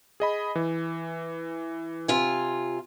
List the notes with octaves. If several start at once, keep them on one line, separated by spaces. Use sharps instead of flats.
G#4 D#5 B5
E3
C3 F4 G#5